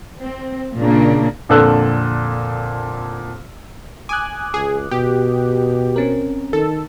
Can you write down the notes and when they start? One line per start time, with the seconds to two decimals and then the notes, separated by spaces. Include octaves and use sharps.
0.19 C4
0.76 A#2 C#3 A#3 D4
1.49 F2 A#2 D3 A4 E6 F#6
4.09 G#5 D6 D#6 F#6
4.54 C#2 G#4
4.91 B2 G4
5.96 C4 C#4 A#4
6.53 D#3 A4